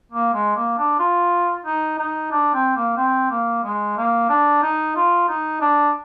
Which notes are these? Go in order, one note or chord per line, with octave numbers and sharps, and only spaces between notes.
A#3
G#3
A#3
D4
F4
D#4
D#4
D4
C4
A#3
C4
A#3
G#3
A#3
D4
D#4
F4
D#4
D4